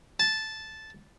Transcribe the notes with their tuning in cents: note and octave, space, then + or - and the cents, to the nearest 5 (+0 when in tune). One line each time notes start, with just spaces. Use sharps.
A5 -5